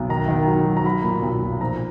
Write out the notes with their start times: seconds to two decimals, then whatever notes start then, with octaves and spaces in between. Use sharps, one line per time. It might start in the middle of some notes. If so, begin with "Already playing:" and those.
Already playing: B1
0.09 D#3 A#5
0.28 D#3
0.48 F#3
0.66 F#3
0.77 A#5
0.84 F#3 B5
1.04 A#2
1.22 B1
1.42 A#2
1.61 F3 A#5